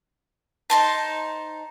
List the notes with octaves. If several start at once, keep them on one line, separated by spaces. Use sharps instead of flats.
D#4 C5 A5